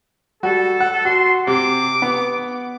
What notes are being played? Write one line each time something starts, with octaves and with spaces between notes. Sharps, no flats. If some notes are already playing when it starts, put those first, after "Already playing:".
G3 F#4 A4
F#5
F#4 C6
C3 D6
B3